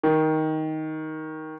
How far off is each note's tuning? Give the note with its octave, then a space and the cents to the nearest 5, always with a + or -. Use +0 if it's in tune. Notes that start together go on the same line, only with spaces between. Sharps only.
D#3 +10